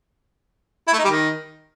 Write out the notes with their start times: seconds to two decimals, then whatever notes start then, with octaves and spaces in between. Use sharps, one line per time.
0.87 E4
0.93 A3
0.99 D#4
1.04 G3
1.10 D#3